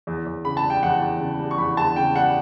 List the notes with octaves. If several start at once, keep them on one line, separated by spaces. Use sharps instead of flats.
E2
E2
C#3 B5
A5
G3
G5
E2 F#5
E2
C#3
G3
C#6
E2 B5
E2 A5
C#3 G5
G3 F#5